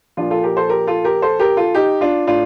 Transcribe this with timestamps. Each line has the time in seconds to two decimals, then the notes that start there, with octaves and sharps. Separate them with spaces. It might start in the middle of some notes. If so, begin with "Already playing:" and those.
0.17 A#2 F3 D4 F4
0.31 F4 A4
0.43 G4 A#4
0.57 A4 C5
0.69 G4 A#4
0.87 F4 A4
1.04 G4 A#4
1.22 A4 C5
1.39 G4 A#4
1.57 F4 A4
1.74 D#4 G4
2.01 D4 F4
2.27 A2 D4 F4